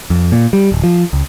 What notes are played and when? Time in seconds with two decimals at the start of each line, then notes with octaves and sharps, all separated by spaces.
0.10 F2
0.32 A#2
0.53 G3
0.72 D1
0.84 F3
1.13 C#2